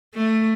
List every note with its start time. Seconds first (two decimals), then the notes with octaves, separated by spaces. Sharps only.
0.15 A3